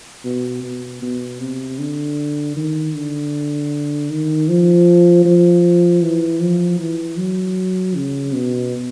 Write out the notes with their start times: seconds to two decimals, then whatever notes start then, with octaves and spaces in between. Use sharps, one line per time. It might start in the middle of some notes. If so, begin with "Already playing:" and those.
0.25 B2
0.64 B2
1.02 B2
1.40 C3
1.79 D3
2.56 D#3
2.95 D3
4.10 D#3
4.49 F3
5.25 F3
6.02 E3
6.41 F3
6.80 E3
7.17 F#3
7.95 C#3
8.33 B2